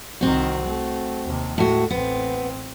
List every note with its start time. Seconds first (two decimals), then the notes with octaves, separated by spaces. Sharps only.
0.21 C2 D#3 C4 F#4
0.66 A3
1.27 D#2 C3
1.58 A2 G#3 F#4
1.91 A1 B3 C4